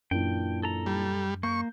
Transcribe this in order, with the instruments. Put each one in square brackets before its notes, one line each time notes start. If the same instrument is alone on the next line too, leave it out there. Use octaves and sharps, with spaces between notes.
[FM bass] F#2 [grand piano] A#2 E3 D4 [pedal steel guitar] G5
[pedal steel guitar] A4 A#5
[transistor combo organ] G3
[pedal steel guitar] A#3 [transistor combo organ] C#6 [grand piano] G6